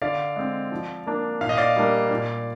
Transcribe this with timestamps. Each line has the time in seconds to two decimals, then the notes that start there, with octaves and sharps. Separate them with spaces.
0.02 D3 D5 F5
0.36 G#3 C4
0.72 F3
1.06 A#3 D4
1.41 A#2 F5
1.49 D#5
1.57 D5 F5
1.76 G3 A#3 D4
2.10 A#2